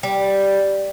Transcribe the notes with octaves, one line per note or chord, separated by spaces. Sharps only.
G3